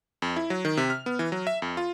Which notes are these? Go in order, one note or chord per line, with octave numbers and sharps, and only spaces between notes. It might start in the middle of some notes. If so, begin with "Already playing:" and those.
F2
E4
F#3
D#3
C3
F6
B3
E3
F#3
E5
F2
F4